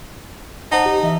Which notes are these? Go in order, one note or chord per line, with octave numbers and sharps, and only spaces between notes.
D#4 C5 F#5 A5
G4
E3 D#5 E5